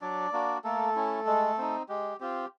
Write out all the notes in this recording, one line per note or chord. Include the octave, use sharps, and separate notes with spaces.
F#3 D4 D5
A#3 D4 F#4
A3 A#3 A4
C#4 E4
G#3
C4 D#4
G#3 G4
C4 F4 G4